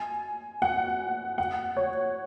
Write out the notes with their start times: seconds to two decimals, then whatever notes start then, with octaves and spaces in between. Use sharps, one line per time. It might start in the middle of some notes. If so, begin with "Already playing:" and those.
Already playing: G#5
0.62 F#5
1.38 F#5
1.77 C#5